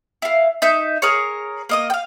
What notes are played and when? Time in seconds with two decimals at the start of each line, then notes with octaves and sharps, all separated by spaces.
0.22 E4 F5
0.62 D#4 E5 G6
1.02 G#4 A#4 C#5
1.69 A#3 D#5 D#6
1.90 F5 G5